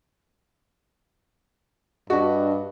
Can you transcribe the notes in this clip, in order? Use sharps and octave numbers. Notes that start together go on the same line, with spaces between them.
G2 D4 F#4 D#5